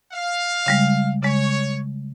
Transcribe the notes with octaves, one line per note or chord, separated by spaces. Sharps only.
F5
C#3 G3 G#3
C#3 G#3 C#5